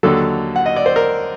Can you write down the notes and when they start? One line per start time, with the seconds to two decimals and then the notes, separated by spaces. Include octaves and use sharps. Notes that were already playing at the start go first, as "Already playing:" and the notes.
0.03 D#2 D3 F#3 A4
0.56 F#5
0.66 D#5
0.76 D5
0.86 C5
0.96 A#4